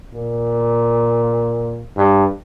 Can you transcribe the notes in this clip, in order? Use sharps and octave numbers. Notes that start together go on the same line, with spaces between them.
A#2
G2